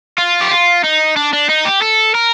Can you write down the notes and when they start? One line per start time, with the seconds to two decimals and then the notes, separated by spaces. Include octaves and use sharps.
0.18 F4
0.41 G4
0.51 F4
0.84 D#4
1.16 D4
1.33 D4
1.49 D#4
1.65 G4
1.81 A4
2.15 A#4